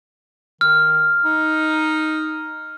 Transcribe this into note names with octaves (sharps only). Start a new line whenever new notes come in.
D#3 F6
D#4